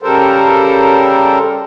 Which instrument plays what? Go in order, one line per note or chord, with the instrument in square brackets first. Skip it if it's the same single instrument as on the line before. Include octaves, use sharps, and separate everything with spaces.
[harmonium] C#3 G3 A4 A#4 C5